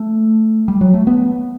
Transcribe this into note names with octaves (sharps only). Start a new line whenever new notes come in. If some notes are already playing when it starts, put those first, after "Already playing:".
Already playing: A3
G3
F#3
A3
B3